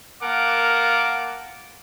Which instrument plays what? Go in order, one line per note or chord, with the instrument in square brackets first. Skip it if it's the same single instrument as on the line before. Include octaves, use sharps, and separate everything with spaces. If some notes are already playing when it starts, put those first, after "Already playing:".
[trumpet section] A#3 A#4 F5 F#5 A5 D6